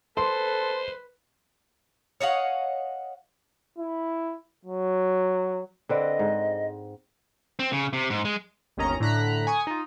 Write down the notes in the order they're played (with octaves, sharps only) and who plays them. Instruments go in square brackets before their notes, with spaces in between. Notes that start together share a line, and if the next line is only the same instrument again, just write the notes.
[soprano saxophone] A4 [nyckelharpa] B4 [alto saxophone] C5 [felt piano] C6
[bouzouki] C#5 D#5 F5 F#5
[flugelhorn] E4
F#3
[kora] D3 C4 B4 [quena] D#5
[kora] G#2
[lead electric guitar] C4
C#3
C3
G#2
G#3
[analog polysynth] G1 D#2 D#3 C#4 D#5 A#5
A2 D3 A#5 F#6 B6
G#5 C#6 D#6
D#4 F4